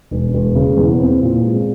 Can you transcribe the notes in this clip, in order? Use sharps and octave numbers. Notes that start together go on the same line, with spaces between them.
E1
E1
C#3
E2
C4
A#2
G#3